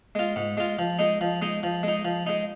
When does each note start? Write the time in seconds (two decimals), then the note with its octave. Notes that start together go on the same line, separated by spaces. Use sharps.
0.15 G#3 F4
0.36 G#2
0.57 G#3 F4
0.79 F3
0.99 G#3 D#4
1.21 F3
1.42 G#3 D#4
1.63 F3
1.83 G#3
1.88 D#4
2.05 F3
2.27 G#3 D#4